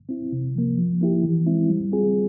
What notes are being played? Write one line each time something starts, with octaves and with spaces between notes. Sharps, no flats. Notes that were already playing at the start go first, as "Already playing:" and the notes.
C4 E4
C3
F3 A#3
F3
A#3 E4 G4
E3
G#3 C4 E4
G3
C4 F4 G#4